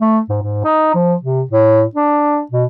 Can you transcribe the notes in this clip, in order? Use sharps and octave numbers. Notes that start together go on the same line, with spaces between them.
A3
G#2
G#2
D#4
F3
C3
A2
D4
B2